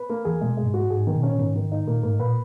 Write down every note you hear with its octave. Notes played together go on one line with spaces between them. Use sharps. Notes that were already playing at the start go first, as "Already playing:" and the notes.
Already playing: B4
A#3
E2 E3 G#4
B2 G#3
F#2 G#3
G#2
F#4
G#2 G#4
D#3
B2
A#2 C#4
G#2 D#3
D#3
D#4
A#2 A#3
G#2 A#3
A#2 B4